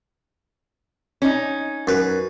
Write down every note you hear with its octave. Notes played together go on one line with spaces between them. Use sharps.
C#4 D#4
F#2 B4